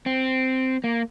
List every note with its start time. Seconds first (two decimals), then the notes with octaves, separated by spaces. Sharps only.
0.06 C4
0.84 A#3